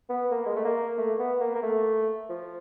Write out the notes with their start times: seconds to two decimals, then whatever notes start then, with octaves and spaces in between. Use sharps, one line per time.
0.09 B3
0.31 A#3
0.46 G#3
0.56 A3
0.65 A#3
0.98 A3
1.19 B3
1.41 A#3
1.55 A#3
1.63 A3
2.30 F3